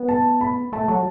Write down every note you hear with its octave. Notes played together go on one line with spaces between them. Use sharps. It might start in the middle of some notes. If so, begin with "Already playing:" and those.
Already playing: B3
A5
B5
A3 A5
F#3